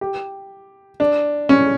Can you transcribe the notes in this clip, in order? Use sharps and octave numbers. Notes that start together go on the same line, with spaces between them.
G4
D4
C#4